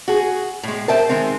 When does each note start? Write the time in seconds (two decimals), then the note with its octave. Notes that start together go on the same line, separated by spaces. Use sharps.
0.08 F#4 G#4
0.63 A2 G#3
0.88 A#4 C5 E5 G5 A5
1.09 D#3 G#3 C4